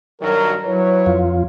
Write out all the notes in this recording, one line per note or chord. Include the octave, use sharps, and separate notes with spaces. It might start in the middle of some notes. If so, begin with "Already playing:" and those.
G2 D#3 F#3 A#4
F#3 E4 B4 C#5
F2 F4